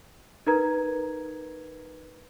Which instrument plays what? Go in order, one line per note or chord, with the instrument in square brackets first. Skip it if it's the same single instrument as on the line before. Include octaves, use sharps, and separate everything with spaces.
[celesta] D#4 A#4 B4 A#5 G#6